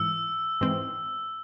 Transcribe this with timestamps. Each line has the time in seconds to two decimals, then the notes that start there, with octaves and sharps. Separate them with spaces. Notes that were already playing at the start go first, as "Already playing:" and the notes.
Already playing: G#2 E3 E6
0.61 G#2 E3 C4